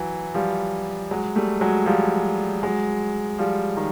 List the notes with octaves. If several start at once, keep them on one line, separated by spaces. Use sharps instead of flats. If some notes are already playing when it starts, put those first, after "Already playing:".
Already playing: E3 F#3
F3 G3
F#3 G#3
G3 A3
F#3 G#3
F3 G3
F#3 G#3
F3 G3
D#3